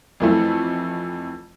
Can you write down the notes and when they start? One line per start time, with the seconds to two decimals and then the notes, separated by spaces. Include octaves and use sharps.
0.20 F2 E3 A3